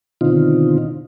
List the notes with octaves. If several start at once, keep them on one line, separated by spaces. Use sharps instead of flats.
B2 D3 D#3 C4 D#4 F4